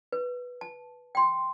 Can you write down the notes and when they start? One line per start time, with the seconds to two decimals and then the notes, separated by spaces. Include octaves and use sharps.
0.12 B4
0.61 A5
1.15 G5 C6